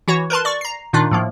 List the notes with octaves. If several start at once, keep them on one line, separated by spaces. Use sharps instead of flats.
E3 F#4 C#5
A#4 B4 A5 C6
D5 C#6
A#5 C7
A#2 D#3 D4 D#4 F4
A2 F3 A#3